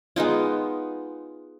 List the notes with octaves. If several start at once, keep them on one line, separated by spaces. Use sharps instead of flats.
G#3 B3 D#4 F4